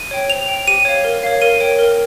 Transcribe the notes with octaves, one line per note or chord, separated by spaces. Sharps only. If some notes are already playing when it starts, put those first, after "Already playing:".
Already playing: D#7
C#5 G5
C5 F7
G5
G4 D#7
C#5 F5
A#4
C#5 F5
A#4 D#7
C#5 G5
A#4